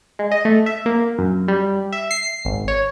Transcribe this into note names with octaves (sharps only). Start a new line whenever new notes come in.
G#3
D#5
A3
E5
A#3
F#2
G3
E5
C7
G#1
C#5